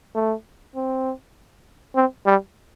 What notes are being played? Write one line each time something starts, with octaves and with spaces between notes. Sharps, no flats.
A3
C4
C4
G3